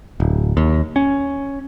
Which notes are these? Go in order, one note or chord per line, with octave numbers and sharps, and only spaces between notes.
D1
D#2
C#4